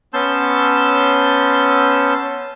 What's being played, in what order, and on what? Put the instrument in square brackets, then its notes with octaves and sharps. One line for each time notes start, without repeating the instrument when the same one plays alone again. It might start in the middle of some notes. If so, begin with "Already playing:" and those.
[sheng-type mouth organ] B3 C#4 A5 C6 E6 G6